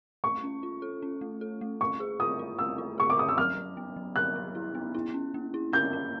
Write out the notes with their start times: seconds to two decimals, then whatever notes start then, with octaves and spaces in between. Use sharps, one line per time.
0.24 A3 C#6
0.44 C#4
0.63 F4
0.82 A4
1.02 C#4
1.21 A3
1.41 A4
1.61 A3
1.81 A3 C#6
2.00 G#4
2.20 F4 D#6
2.39 F4
2.59 A3 E6
2.78 F4
2.98 G#4 C#6
3.10 D6
3.17 C#4 D#6
3.28 E6
3.38 F#3 F6
3.57 F#3
3.77 B3
3.96 F#3
4.16 F#3 F#6
4.36 E4
4.55 E4
4.75 B3
4.94 E4
5.14 C#4
5.34 A#3
5.54 E4
5.73 C#4 G6
5.93 C#4